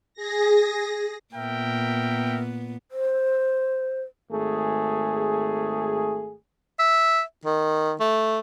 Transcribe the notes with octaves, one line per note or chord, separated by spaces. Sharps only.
G#4 A#6
A#2 B3 A#4 E5 G5
C5
G#1 A3 G#4
E5
D#3
A3